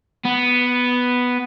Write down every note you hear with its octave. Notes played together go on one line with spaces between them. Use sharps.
B3